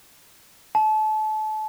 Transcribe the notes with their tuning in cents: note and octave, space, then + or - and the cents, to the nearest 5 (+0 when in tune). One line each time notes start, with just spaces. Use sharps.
A5 -30